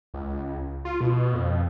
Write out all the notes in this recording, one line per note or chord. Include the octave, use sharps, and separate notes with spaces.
C#2
F4
B2
F2